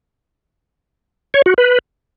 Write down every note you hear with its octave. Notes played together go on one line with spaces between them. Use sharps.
C#5
F#4
B4